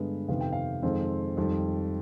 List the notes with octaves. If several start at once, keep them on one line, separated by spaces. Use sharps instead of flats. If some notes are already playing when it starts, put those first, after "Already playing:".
Already playing: G2 D3 G#3 B3
F2 C3 D#3 B3 F5
G5
F5
F2 D#3 G#3 C4
F2 D#3 G3